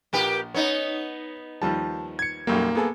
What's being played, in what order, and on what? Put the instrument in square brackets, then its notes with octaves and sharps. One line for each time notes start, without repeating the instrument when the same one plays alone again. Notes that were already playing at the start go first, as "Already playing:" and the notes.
[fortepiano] A#1 [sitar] A#3 G4 B4
[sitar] B3 D#4 [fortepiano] C#4 [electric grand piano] C#5
[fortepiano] D#2 F3 G3 [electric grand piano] A5
[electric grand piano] G#6 C#7
[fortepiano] B1 F#2 G3 [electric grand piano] A#3
[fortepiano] B3 G#4 A4